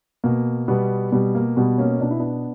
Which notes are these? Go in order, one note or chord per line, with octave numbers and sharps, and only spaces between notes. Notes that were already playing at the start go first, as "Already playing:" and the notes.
B2 A#3
B2 G3 B3
B2 G3
A#3
B2 G3 B3
A#3 C#4
B2 D4
E4
B3 D4